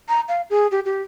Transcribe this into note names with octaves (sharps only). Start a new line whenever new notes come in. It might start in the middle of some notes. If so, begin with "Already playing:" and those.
A#5
F5
G#4
G4
G4